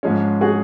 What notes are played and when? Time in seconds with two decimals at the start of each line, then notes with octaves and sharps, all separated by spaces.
0.03 G#2 F3 G#3 C#4
0.41 F#4 G#4